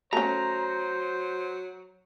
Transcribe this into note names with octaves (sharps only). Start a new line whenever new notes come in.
F#3 A3 C#4 C5 A#5